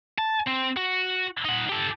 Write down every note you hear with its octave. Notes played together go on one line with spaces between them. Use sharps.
A5
C4
F#4
D#4 F#5
G4 A4